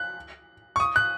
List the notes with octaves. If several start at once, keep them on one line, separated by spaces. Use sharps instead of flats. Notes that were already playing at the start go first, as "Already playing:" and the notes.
Already playing: F#6
C#6
D#6
F#6